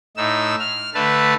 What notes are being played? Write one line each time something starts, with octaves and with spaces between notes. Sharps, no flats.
A2 D#4 E6
F6
D3 A3 B4 A5